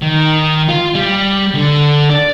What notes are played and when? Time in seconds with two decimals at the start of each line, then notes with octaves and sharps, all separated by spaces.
0.02 D#3
0.69 F4
0.95 G3
1.54 D3
2.10 D5